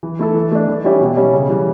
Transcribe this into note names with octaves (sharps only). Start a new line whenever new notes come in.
E3
A3 E4 A4
E3
A3 D4
E3
G3 C#4 E4 G4
B2
G3 C#4
C#3
E3 G3